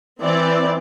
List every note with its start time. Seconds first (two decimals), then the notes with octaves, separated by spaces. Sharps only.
0.22 E3 C4 D5